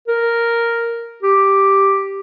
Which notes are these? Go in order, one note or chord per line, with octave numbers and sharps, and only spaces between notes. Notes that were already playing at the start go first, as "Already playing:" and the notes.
A#4
G4